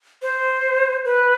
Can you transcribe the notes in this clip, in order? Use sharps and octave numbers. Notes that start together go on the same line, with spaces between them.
C5
B4